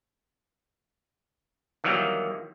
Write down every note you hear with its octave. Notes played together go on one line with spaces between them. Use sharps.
D#3 E3 F#3 G3 A#3 B3